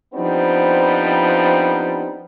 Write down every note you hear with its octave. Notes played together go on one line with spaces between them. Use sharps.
F3 G3 B3 C4 D4 D#4